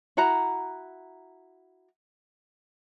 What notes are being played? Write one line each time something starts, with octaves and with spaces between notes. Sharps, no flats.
E4 F#4 F#5 A#5